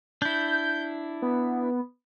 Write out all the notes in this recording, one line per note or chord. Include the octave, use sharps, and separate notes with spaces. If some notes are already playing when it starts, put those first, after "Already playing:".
D4 E4 G6
B3